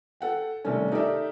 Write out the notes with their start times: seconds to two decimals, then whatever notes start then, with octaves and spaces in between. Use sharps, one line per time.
0.21 A4 F#5 G5
0.65 C3 D#3 G3 A3 C#4
0.92 D#4 G4 A4 A#4 D5 E5